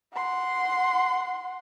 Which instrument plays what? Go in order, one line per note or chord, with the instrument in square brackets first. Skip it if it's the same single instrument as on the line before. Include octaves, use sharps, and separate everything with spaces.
[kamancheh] F#5 C6